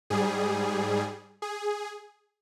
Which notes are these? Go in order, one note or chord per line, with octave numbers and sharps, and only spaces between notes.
G#2 G3 G#4
G#4